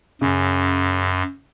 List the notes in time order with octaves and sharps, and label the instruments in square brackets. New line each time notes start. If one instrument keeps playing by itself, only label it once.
[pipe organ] F#2 [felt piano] C#3